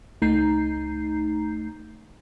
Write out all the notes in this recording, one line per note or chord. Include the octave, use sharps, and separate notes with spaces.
C#2 A3 D#4 A#5 G6 C7